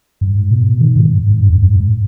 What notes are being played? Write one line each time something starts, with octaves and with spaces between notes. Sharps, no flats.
G2
G#2
B2
D#3
G#2
G2
G#2
G2
F2
G2
G#2
G#2